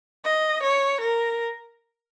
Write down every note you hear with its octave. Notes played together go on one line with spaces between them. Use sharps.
D#5
C#5
A#4